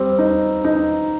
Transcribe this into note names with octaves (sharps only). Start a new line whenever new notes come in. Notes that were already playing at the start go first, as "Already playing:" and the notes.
Already playing: G3 C4
D#4
D#4